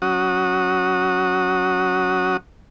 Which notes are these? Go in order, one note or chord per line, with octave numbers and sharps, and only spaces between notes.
F#3 C#4 F#4 D#6